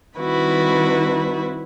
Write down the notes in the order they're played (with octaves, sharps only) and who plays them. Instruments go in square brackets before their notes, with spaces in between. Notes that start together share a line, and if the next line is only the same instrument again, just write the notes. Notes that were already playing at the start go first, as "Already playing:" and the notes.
[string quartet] D#3 G3 C4 E4 F#4 B4